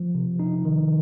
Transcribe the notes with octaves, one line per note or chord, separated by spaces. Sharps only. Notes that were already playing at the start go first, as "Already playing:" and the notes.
Already playing: F3
C3
D#4
D#3